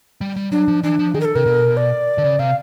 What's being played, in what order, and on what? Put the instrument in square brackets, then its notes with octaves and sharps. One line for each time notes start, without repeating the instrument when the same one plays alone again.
[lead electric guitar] G3
G3
[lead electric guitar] F#3 [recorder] D4
[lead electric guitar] F3
[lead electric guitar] E3 [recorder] D4
[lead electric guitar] F3
[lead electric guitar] D#3 [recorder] G#4
[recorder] A#4
A4
[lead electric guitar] C3 [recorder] A#4
[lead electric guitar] B2
[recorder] D5
[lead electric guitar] D3
C#3
[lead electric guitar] C3 [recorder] F5